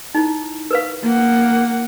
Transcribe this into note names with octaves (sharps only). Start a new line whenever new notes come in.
D#4 E4
A#4 B4 F5
A#3 F#5